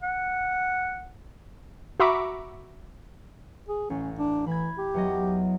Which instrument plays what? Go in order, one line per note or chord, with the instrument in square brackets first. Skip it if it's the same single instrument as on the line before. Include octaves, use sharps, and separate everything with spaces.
[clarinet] F#5
[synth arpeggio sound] F#4 E5 A#5 B5 C#6 D6
[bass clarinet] G#4
[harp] A1 [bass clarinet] C#4
[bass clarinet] D4
[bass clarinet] E3 [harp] B5 G#6
[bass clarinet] G4
[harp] E2 F#3 D#5